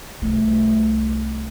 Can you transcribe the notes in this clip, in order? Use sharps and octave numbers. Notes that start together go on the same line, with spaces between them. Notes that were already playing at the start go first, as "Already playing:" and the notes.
C2 A3